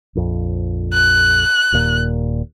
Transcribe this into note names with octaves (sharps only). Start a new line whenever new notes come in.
A#1 F2
F#6
D#1 D#2 A#2